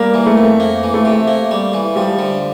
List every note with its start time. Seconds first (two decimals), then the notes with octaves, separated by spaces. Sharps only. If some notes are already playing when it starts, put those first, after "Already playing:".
Already playing: G3 A#3
0.14 E3
0.26 A3
0.38 F2
0.60 A#3
0.83 E3
0.94 A3
1.05 C3
1.28 A#3
1.51 G3
1.73 E3
1.96 F3 G3
2.19 D3